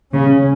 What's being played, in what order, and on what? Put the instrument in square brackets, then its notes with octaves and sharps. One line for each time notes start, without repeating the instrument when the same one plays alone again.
[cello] C#3 [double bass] C#4